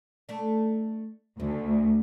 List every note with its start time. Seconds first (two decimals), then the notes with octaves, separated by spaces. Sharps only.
0.29 A3 D4
1.40 D2 C#3